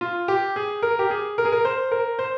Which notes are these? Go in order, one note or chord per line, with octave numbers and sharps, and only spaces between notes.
F4
G4
G#4
A#4
G4
G#4
A#4
G#4
A#4
C5
A#4
C5